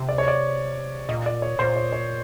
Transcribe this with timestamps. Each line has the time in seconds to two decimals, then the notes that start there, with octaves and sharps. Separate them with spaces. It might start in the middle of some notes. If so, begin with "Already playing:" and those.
Already playing: C3
0.09 D5
0.18 C#5
0.28 D5
1.09 A#2 D#5
1.26 D5
1.42 C#5
1.59 A#2 C5
1.76 C#5
1.92 C#5